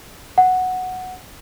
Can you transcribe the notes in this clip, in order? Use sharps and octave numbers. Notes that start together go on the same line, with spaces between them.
F#5